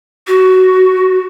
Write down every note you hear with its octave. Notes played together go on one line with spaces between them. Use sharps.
F#4